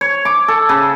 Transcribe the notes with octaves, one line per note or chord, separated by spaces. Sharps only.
C#5
D6
A4
C#3